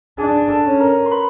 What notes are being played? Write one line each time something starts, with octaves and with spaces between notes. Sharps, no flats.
D4 G#4 G#5
A4 A5
C#4
A#4 A#5
C6
B4 B5